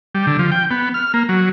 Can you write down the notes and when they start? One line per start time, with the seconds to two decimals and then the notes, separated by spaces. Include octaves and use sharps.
0.15 G3
0.27 D3
0.39 F3
0.52 G5
0.71 B3
0.94 F6
1.14 A#3
1.29 F#3